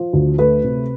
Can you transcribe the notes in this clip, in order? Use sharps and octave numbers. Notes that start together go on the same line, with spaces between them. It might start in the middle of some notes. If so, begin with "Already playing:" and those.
Already playing: F3
D2
A3 B4
C3